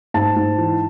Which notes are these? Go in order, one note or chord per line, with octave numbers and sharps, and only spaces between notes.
G#2 A5
G#2
E3